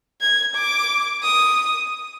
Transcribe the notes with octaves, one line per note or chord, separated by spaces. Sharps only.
G#6
D6
D#6